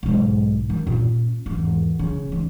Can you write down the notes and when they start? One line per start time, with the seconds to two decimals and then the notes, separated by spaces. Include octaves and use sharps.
0.03 B1 G#2
0.70 D#3
0.87 A#2 C#4
1.46 G#1 E2
1.99 C#3
2.29 E3 D#4